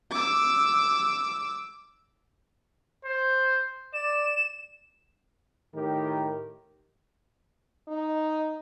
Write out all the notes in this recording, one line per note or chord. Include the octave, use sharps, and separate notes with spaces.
D6 E6
C5
D5 E7
A2 D#3 G4 A#4
D#4